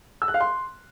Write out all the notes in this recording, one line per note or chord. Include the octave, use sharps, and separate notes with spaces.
E6
F#6
F5
C6